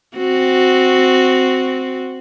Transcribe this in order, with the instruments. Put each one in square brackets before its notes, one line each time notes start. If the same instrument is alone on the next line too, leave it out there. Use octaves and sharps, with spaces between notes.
[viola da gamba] C4 F#4